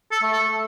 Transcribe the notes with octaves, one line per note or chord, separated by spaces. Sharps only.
A4
A3
A4